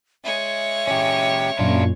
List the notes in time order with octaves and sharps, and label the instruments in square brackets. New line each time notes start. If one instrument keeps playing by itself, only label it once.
[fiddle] G#3 C#5 [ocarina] E5
[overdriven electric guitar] C#4 G4
[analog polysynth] F#2 A#2 [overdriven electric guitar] D4 F4